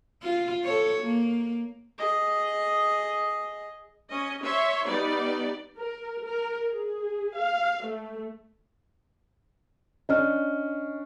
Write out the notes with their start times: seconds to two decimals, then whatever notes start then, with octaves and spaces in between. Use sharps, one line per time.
0.23 F4
0.64 A4 C#5
1.03 A#3
1.98 G#4 D#5
4.10 C#4 D#5
4.43 C#5 E5 C6
4.87 G3 B3 D#4 D5
5.78 A#4
6.25 A#4
6.69 G#4
7.36 F5
7.85 A3
10.09 C#4 D4 D#5 F6